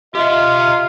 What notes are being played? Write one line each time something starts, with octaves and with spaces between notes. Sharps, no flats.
F4 G4 D#5 E5